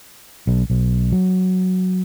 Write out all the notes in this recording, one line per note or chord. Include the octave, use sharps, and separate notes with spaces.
B1
B1
F#3